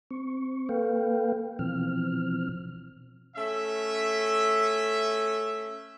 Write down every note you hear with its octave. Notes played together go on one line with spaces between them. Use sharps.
C4 C#6
A#3 A4 B4 F5 G5
B2 E3 F3 C4 F6
A3 C#4 E5